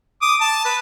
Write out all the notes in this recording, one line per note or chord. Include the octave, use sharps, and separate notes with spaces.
D6 D#6
A5
B4